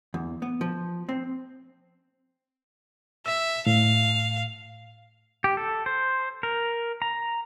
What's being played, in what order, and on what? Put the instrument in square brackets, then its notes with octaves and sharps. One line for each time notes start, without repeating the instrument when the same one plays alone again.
[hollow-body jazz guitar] E2
B3
F3
C4
[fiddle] E5 [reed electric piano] E6
[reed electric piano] A2 [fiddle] F5
[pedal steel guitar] G4
A4
C5
A#4
A#5